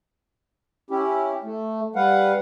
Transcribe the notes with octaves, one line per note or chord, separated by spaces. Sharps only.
C#4 E4 G4
A3
G3 B4 F5 F#5